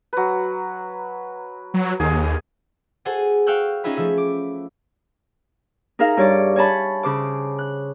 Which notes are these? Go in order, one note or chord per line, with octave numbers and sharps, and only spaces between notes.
F#3 B4
F#3
D#2 G#4
F#4 G#4 A4 C5 F#5 G#5
F5 G5 C#6 E6 F#6 G6
C#4 D#4 F4 G#4 E5 B5
F3 A3 E5
D6
D#4 G#4 A#4 E5 F5
G2 C#5 D5
C#5 G#5 A5 B5
C#3 C5 D6
F#6